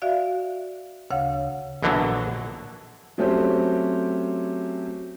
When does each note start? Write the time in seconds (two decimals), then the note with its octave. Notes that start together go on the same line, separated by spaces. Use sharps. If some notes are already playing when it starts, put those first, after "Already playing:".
0.02 F#4 D5 E5 F5
1.10 D2 C#3 C#5 F5 F#5
1.83 A#1 B2 D3 E3 F#3
3.18 F#3 A3 C4 C#4 G4 C5